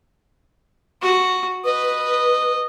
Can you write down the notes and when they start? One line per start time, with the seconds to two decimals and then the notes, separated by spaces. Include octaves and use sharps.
1.02 F#4
1.65 B4 D#5